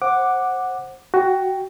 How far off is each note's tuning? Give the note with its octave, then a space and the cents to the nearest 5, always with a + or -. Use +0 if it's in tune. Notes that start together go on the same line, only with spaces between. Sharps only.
C5 +20 F#5 +0 D6 +5
F#4 +15 G5 +0